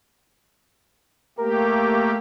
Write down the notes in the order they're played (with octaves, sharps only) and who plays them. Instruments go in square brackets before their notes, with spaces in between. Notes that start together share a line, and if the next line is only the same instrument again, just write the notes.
[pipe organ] A3 A#3 G4 [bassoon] A#4